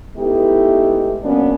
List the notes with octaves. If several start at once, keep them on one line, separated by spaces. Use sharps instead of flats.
G#3 A3 B3 D#4 E4 G4
C#3 F#3 A#3 B3 C#4 D4